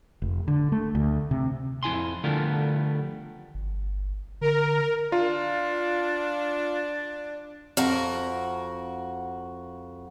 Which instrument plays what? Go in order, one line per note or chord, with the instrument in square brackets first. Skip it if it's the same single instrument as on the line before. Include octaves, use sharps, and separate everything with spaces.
[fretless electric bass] F1
D3
A3
D2
C3
[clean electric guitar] F2 E4 G#5 C6
D3 F3 G3 A3 B3 A#4
[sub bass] G1
[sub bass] D3 [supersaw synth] A#4
[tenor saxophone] D4 [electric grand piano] F4
[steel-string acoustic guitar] F2 F#4 A#4